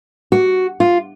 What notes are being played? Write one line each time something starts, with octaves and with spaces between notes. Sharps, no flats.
F#4
F4